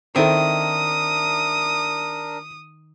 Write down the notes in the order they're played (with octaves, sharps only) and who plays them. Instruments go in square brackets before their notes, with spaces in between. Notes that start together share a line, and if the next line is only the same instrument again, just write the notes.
[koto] D#3 [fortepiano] C4 E4 A4 [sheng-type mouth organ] D4 A#4 [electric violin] D#6